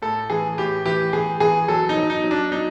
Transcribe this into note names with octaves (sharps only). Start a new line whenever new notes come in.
A2 A4
E3 G#4
A2 G4
E3 G4
E3 G#4
E3 G#4
F#3 A4
D#4
F#3
D#4
F#3
D4
F#3 D#4